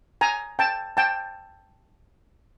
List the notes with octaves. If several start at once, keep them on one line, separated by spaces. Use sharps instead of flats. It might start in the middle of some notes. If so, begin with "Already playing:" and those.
G#5 A#5
G5 A5
G5 A5